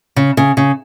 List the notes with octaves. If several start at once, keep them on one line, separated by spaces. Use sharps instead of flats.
C#3
C#3
C#3